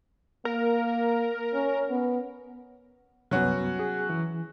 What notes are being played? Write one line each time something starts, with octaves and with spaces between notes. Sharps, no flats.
A#3 A#4
C#4
B3
C2 F#2 F#3 B3 C#4 F#4
G#4
E3